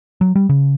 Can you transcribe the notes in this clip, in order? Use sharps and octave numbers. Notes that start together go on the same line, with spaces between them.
F#3
G3
C#3